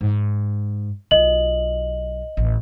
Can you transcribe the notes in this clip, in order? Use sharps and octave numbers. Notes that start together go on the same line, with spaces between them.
G#2
B1 F4 D#5 F#7
A1